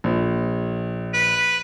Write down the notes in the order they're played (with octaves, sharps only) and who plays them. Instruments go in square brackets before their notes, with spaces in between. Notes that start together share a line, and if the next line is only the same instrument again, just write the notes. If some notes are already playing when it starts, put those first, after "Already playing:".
[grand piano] A#1
[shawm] B4